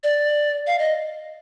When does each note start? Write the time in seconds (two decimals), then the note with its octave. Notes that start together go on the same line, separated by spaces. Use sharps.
0.04 D5
0.67 F5
0.79 D#5